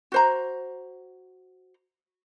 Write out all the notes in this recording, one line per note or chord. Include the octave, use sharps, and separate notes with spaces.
F#4 C5 A#5